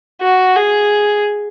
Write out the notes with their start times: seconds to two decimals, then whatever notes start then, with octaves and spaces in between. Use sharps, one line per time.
0.21 F#4
0.56 G#4